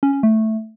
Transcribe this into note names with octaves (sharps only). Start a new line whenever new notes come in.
C#4
C#4
A3